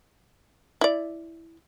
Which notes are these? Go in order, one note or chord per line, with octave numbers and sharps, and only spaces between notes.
E4 D5